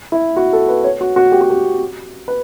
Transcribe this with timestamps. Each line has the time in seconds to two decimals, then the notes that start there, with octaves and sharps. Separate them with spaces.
0.12 E4
0.36 F#4
0.53 A4
0.69 B4
0.84 C#5
1.01 F#4
1.16 F#4
1.32 G4
1.41 F#4
1.50 G4
2.28 B4